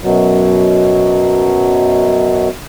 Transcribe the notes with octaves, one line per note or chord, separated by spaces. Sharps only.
F#2 B2 F#3